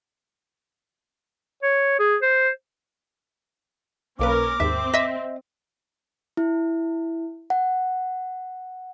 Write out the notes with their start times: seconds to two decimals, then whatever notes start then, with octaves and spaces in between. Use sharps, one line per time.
1.63 C#5
1.99 G#4
2.22 C5
4.19 B1 A#3 C#4 A#4 B4 D6
4.60 D#2 G#2 C4 E5
4.94 D#5 E5 E6 B6
6.37 E4
7.50 F#5